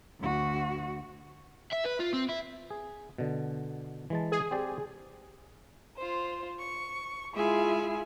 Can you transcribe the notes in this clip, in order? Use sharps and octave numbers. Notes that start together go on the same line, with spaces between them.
D2 F#4
E5
B4
F4
C4
E4
G#4
B2 D3
E3 G#3 A5
G#4
C4 G4 D5
F4 C5
C#6
G#3 E4 F4 G#4 E5 G#5